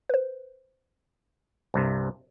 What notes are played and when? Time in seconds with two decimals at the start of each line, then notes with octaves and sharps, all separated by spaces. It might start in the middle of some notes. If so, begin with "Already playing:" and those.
0.09 B4 C5
1.74 C2 G2 C3